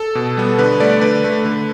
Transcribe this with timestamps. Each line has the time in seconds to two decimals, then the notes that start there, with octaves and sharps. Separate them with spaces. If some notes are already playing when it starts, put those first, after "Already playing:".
Already playing: A4
0.15 B2
0.37 G3 B3
0.58 D3 B4
0.80 A3 D5
1.01 D3 B4
1.24 A3
1.45 D3